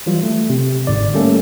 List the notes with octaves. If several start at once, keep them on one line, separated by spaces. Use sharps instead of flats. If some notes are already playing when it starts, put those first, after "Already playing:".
E3 F#3 G3 F4
A3
C3
G1 G#2 D3 D5
G3 A3 A#3 C#4 A4